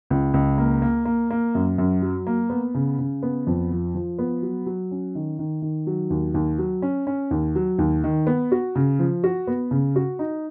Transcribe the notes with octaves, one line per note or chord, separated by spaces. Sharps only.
C#2
C#2
A#3
A#3
A#3
A#3
F#2
F#2
F#3
A#3
B3
C#3
C#3
B3
F2
F3
F3
B3
F#3
F#3
C#4
D#3
D#3
D#3
F#3
D#2
D#2
F#3
C#4
C#4
D#2
F#3
D#2
D#3
B3
F#4
C#3
F3
F#4
B3
C#3
F#4
D#4